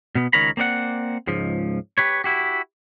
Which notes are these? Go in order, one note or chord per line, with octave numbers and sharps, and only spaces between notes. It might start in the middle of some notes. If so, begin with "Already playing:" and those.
B2 B3
C#2 D#3 A#4 C#5 A#5 B5
A#3 C4 D5 F#5
C#2 G#2 F3
G4 B4 C#5
E4 F#4 G4